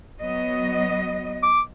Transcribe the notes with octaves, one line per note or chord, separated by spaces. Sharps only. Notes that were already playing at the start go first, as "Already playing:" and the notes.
F#3 B3 D#5
D6